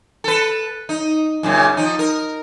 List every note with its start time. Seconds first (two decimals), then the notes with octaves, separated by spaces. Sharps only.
0.24 A4 B4
0.89 D#4
1.43 F#2 A#2 C#3
1.77 F3 D#4
1.99 A#4